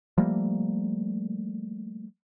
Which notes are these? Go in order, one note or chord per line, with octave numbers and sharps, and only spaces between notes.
F3 G3 A3 A#3